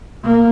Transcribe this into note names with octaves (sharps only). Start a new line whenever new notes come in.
A#3